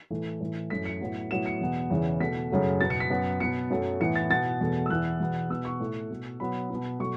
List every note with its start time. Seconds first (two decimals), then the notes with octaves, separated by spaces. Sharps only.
0.10 A2 E3 A3
0.40 A2 E3 A3
0.70 F#2 E3 A3 B6
0.86 C#7
1.00 A2 F#3 B3
1.31 A2 F#3 B3 E7
1.46 C#7
1.61 E2 B2 B3
1.90 E2 C#3 E3
2.20 B2 A3 B6
2.50 F#2 C#3 F#3 A3
2.81 B2 B3 A6
2.90 C#7
3.00 B6
3.10 F#2 F#3 B3
3.40 B2 B3 C#7
3.70 F#2 F#3 A3
4.00 A2 E3 B3 C#7
4.16 A6
4.30 B2 B3 A6
4.61 E2 B2 A3
4.86 E6
4.90 E2 E3 B3 F#6
5.20 E2 B2 B3
5.50 B2 B3 E6
5.65 C#6
5.80 A2 A3
6.11 B2 A3
6.40 B2 F#3 B3 B5
6.70 B2 B3
7.00 B2 F#3 A3 C#6